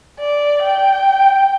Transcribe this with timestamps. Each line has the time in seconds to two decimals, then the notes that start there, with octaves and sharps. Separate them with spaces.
0.19 D5
0.63 G5